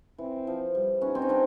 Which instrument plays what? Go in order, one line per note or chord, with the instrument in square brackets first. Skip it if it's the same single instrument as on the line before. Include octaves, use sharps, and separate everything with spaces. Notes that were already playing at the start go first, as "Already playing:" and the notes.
[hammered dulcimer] E3 [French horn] C4
[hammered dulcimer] F3
G3
[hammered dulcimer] B3 C#4 [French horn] D#4
[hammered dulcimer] C4
C#4
C4 D4